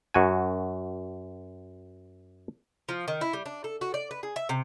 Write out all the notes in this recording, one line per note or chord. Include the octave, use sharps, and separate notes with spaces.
F#2 F#4 G#5
F3
D#3
E4
G3
D4
A4
F#4
D5
B4
G#4
E5
C3